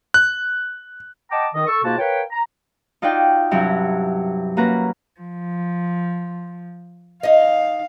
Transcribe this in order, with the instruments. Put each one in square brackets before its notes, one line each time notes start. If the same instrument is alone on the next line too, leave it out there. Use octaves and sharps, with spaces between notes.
[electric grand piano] F#6
[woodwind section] D#5 F#5 G5 A5 A#5 D6
D#3 D#5
A4 C#6 E6
G#2 B2 A#3 F4 F#4 A5
A#4 B4 C#5 F5 G5
A#5
[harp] D#4 F4 F#4 D5 G5
G2 C3 F#3 C4 C#4 E4
A#3 C#4 F#4 B4 A#5
[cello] F3
[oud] D#4 D#5 [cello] F5